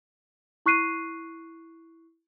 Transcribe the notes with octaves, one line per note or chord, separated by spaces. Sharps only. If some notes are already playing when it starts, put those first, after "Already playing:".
E4 C#6 F#6 C7 D#7